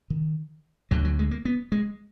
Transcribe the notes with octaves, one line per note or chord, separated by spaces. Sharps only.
D#3
D2 D3 F#3
F#3
G#3
A#3
B3
G#3